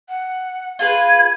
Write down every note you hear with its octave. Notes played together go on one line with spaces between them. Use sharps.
F#5
F4 G#4 B4 G#6